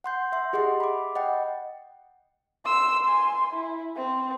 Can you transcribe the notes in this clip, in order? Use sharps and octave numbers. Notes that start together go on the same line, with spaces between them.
F#5 C6 G6
E5 C6
G4 G#4 D#5 F#5 C6
B5 D6
D#5 F#5 G5
C6 E6
G#5 C6
E4
C4